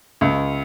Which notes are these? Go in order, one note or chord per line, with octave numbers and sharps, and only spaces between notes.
C#2